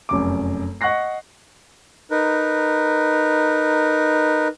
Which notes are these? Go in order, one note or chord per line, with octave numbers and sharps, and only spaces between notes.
F1 F#2 D6
D#5 F#5 C#6 F#6 A#6 C7
D#4 A#4 B4